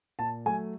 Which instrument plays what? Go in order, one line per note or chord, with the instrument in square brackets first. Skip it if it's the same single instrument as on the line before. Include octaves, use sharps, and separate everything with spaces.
[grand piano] A#2 A5
F#3 A3 G#5